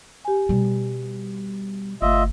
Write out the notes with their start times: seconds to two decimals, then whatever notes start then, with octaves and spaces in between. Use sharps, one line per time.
0.25 G4 G#5
0.49 B2 G3
2.02 G1 A3 F4 D#5 E5